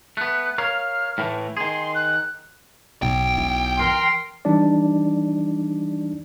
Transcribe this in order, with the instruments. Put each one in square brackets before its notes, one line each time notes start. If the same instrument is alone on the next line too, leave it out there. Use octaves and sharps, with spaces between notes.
[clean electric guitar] A3 B3 [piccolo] F#6
[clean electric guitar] A#4 C#5 F5 [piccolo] F6
[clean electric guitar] A2 E3 A3
[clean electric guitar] D#3 G#4 [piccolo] C6
[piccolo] F#6
[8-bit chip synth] B1 [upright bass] B2 [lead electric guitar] G5
[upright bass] E4
[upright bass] E3 [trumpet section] A#4 C6
[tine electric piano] E3 G3 D4 D#4 D5